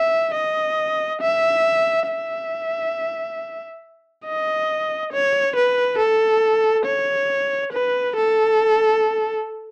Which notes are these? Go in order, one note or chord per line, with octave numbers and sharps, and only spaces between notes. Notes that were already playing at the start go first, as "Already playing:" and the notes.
Already playing: E5
D#5
E5
E5
D#5
C#5
B4
A4
C#5
B4
A4